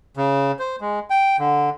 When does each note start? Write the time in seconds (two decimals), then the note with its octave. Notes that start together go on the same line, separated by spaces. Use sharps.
0.17 C#3
0.59 C5
0.81 G#3
1.10 G5
1.39 D3